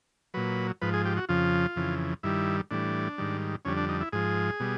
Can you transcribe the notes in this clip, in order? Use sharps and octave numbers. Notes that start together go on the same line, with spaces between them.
A#2 F#3 B4
G#2 F3 B4
G#4
G4
F#4
F2 C#3 F3 F4
F2 C#3 E3
G2 D#3 G3 E4
A2 E3 G3 D4
G#2 D#3 G3
F2 D3 G3 C#4
D4
D#4
E4
G#2 F3 G#4
B2 G3